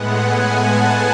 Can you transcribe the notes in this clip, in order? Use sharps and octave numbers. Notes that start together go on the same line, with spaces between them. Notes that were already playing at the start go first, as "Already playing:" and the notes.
Already playing: A2 G#3 B3 F#5
G#5
A5